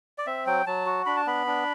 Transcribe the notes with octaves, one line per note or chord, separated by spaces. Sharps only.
D5
C4 E5
F#3 G5
F#3 A5
F#4
D4 B5
A5
B3 B5
D4